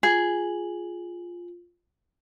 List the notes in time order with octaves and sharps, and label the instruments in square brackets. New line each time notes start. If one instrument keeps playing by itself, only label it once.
[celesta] F4 F#7 [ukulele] G#4